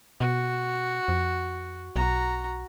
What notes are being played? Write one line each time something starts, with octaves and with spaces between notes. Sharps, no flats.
B2 F#4
F2
B1 F#4 A#5